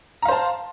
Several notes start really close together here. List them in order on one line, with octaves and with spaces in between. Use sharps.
A#5 F5 C5 A5